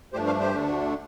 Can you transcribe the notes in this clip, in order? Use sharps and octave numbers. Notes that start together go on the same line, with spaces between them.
G2 F3 A3 D4 G4 C5
C5 F5
G4 C5
D2 D3 A3 D4